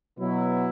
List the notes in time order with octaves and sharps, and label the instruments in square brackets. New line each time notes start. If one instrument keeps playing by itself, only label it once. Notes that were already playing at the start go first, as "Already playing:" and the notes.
[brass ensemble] B2 F#3 B3 E4